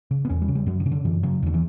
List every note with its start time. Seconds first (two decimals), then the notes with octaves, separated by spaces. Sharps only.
0.11 C#3
0.25 B3
0.29 E2 C#4
0.42 G3
0.48 C#3
0.55 G3
0.67 F#2 F#3
0.80 D3
0.86 C#3
0.91 D3
1.05 F#2 E3
1.23 C#3 F#3
1.43 E2 D3
1.54 E3